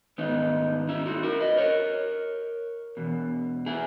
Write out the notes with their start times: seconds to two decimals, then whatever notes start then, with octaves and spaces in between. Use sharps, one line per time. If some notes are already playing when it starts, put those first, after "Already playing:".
0.18 G#2 D#3 B3 D#4
0.89 C#4 E4
1.06 D#4 F#4
1.23 F#4 A#4
1.40 B4 D#5
1.57 A#4 C#5
2.97 E2 B2
3.66 E4 G#4